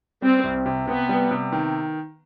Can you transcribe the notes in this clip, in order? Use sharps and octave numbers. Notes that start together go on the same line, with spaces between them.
G3 C4
C2
C3
C3 B3
G3
C3
D#3